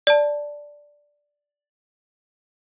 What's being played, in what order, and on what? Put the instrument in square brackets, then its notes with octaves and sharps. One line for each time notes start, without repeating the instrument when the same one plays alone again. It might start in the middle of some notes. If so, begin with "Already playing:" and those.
[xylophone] D5 A5